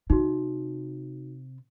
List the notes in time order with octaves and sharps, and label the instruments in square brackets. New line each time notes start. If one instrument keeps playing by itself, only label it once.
[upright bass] C3 [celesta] D#4 F#4